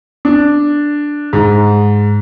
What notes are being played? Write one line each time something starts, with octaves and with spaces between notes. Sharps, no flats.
D4
G#2